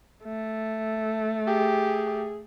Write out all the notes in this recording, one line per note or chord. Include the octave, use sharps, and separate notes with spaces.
A3
G4 G#4